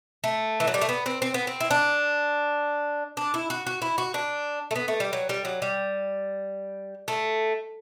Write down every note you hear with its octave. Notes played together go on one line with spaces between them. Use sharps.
A3
E3
F#3
G3
A3
B3
C4
C4
B3
C4
E4
D4
D4
E4
F#4
F#4
E4
F#4
D4
A3
B3
A3
G3
F#3
G3
F#3
G3
A3